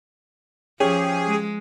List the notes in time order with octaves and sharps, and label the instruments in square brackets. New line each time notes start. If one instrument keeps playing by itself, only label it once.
[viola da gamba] F3 [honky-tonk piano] C#4 G4 [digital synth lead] G#4
[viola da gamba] G#3